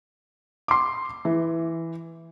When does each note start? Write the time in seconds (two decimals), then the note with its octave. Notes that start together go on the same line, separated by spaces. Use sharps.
0.68 C6 D6
1.25 E3